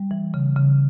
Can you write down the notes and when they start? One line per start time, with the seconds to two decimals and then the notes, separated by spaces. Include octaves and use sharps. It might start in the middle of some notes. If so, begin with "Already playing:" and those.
Already playing: G3
0.11 E3
0.34 C#3
0.56 C#3